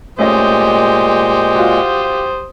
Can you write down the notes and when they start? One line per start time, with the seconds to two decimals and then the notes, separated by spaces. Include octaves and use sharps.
0.19 A#2 G#3 A3 C#4 G4 C5 D#5 D#6
1.55 F4 F#4